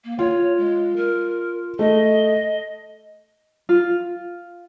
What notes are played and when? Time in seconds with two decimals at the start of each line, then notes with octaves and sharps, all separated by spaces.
0.04 A#3
0.19 F4 C#5
0.57 G#3
0.96 A#4
1.79 A3 D#5
3.69 F4